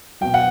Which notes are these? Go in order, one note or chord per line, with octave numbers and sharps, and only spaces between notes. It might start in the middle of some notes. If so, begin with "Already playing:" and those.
B2 F#3 G5
F#5